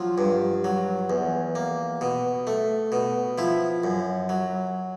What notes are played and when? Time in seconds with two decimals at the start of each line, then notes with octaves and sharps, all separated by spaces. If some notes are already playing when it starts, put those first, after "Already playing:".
Already playing: F3 F#3 F4
0.18 G2
0.64 F#3
1.10 E2
1.55 A#3
2.01 B2
2.47 A3
2.92 B2
3.38 F3 E4
3.84 F#2
4.29 F#3